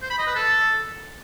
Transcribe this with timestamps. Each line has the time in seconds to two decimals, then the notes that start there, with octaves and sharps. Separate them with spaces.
0.02 C5
0.10 B5
0.19 D#5
0.27 B4
0.36 A4